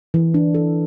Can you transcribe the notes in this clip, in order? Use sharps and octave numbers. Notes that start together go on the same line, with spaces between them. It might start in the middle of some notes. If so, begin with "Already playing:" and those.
E3
D4
A4